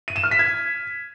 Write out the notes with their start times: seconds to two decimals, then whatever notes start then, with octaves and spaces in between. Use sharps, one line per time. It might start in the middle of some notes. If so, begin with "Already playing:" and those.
0.08 D#7
0.16 E7
0.24 F6
0.31 B6
0.39 G#6